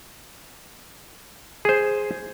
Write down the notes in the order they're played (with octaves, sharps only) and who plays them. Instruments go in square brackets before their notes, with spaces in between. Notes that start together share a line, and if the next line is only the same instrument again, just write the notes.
[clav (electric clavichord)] G#4 C5